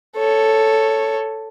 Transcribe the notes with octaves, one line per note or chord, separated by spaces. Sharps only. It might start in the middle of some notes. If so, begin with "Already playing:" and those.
A4 C#5